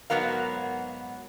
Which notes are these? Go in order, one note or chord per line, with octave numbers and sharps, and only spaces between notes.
G#2 F#3 B3 A#4 F5